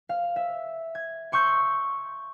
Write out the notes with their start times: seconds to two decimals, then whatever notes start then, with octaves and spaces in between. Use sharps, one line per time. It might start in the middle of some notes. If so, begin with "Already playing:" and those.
0.09 F5
0.36 E5
0.95 G#6
1.32 C6 C#6 E6 G6 C7